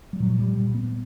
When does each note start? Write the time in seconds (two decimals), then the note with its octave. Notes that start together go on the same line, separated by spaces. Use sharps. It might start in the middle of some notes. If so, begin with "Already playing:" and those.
0.13 G3
0.20 A#2 F#3
0.39 G3
0.57 A#2
0.74 B3